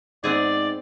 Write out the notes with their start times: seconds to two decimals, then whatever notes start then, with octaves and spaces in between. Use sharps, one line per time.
0.24 G#2 B3 C4 G#4 D5